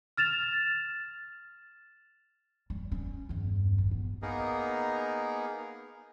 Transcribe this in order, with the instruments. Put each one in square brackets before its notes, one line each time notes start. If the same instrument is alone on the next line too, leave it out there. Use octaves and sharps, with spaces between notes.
[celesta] F6 A6 E7 F7
[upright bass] G3
C#4
E2 G2
A1
B3
[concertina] A#3 B3 D#4 G#4 A#4